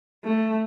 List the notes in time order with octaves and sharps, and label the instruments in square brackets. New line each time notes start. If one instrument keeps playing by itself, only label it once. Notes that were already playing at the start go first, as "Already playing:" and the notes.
[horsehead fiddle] A3